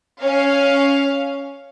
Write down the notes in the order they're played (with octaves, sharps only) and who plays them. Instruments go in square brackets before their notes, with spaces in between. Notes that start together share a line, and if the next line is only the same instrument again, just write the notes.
[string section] C#4 F5